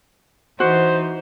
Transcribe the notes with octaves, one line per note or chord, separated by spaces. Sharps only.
E3 D#4 F#4 C5